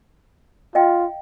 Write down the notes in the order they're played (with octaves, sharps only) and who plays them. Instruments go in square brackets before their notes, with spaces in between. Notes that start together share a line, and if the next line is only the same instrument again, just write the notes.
[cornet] F4 [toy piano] D#5 F5 G5